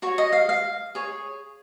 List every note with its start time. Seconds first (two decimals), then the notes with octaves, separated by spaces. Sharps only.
0.02 F#4 C#5 C#6
0.18 D#5
0.32 F5
0.49 F5
0.95 G#4 C#5